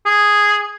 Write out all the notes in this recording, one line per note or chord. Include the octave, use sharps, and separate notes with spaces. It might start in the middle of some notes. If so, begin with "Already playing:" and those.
G#4